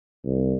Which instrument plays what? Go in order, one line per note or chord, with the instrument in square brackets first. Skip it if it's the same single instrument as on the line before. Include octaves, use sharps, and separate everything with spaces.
[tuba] C2